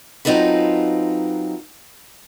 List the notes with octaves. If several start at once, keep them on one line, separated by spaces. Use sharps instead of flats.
F#3 C4 D#4 F4 A4 B4